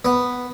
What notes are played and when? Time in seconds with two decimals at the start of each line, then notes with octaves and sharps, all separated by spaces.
0.05 B3